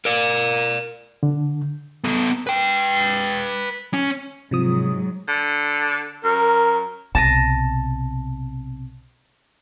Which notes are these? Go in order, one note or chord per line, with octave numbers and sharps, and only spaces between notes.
A#4 D5
D3
B3 A4
B4 G5
C#4
G#2 C3 F3 F#3 D#6
D3
F#2 A#4
B1 C3 A5 A#6 D#7